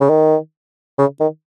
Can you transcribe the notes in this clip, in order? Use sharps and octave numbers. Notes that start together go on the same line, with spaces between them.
C#3
D#3
C#3
D#3